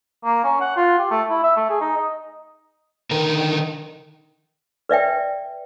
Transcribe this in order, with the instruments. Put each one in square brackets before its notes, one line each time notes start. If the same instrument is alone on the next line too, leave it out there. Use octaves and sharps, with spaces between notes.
[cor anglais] A#3
C#4
F#5
F4
G4
A3
E4
E5
A3
G#4
D#4
D#5
[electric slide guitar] D3 D#3 D#4 A#4 A#5
[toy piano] B4 D5 E5 G5